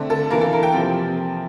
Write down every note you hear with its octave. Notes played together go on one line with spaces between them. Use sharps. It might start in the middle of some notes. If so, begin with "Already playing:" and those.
Already playing: D3 A3 C4
A4
E3 A#3 A#4
A4
A#4
G5
C3 F3 C4